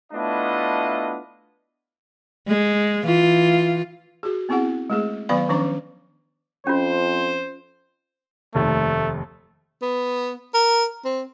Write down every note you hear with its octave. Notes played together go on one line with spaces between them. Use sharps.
A3 B3 D4 E4 F4 D#5
G#3
E3 F4
F#4 G#4
B3 C4 E4 G#4 F#5
G#3 A3 G#4
D#3 F#3 B3 D5 F5 B5
D#3 F3 C#4 D4 C5 D6
F2 C#4 F4 C5
F1 D#2 A3
B3
A#4
C4